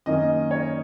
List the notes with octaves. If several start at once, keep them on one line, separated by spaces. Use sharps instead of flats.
F#2 D#3 A#3 C#4 D#5
C#5